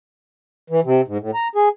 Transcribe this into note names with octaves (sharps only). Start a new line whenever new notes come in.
E3
C3
G#2
A2
A#5
G#4